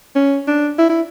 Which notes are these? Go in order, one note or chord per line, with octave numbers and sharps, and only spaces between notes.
C#4
D4
E4
E4